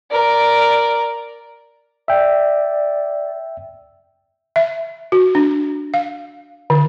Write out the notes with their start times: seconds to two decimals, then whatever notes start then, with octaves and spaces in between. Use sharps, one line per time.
0.12 A#4 D5
2.08 D5 E5 G5
4.56 E5
5.12 F#4
5.35 D4
5.94 F5
6.70 D3